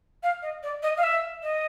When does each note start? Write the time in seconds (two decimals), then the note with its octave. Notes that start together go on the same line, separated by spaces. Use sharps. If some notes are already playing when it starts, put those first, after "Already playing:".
0.23 F5
0.42 D#5
0.63 D5
0.83 D#5
0.97 F5
1.03 E5
1.43 D#5